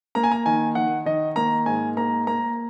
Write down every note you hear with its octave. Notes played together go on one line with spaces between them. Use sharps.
A#3 A#5
G#5
A#5
D#3 G#5
D#3 F#5
D#3 D#5
A#3 A#5
G#2 G#5
A#3 A#5
A#3 A#5